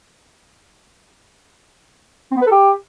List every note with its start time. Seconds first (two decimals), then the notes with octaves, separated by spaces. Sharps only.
2.31 C4
2.36 B3
2.41 B4
2.47 A4
2.52 G4